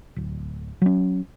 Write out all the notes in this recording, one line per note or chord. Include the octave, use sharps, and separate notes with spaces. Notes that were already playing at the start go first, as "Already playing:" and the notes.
D1
F#3 C#4